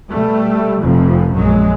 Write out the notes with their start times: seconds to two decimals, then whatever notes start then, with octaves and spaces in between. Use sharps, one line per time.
0.10 B2 G3 A3
0.81 F1 F2 C3 F3
1.34 A#1 F#2 F#3 G#3